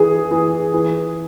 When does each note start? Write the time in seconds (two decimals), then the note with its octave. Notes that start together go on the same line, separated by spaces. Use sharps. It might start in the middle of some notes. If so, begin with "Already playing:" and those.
Already playing: E3 G#4
0.31 E3
0.74 E3